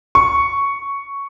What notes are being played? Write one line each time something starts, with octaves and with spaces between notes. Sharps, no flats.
C#6